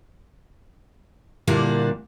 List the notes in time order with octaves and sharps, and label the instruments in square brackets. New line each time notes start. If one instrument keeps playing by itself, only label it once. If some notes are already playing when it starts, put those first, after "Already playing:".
[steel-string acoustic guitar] A#2 D3 G3 A#3 D4 E4